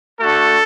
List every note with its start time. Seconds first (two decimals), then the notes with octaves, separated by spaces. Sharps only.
0.18 A3 D4 F#4 A4